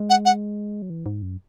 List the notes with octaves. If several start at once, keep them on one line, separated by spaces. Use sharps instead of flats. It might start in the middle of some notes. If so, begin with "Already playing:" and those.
Already playing: G#3
F#5
F#5
F#3
E3
G#2
F#2